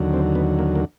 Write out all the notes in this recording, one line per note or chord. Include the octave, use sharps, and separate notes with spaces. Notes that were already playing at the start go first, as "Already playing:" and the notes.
Already playing: D#2 D3 F#3
C4
B3
A#3
A#3